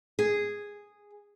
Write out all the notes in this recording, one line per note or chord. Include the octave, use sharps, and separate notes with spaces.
G#4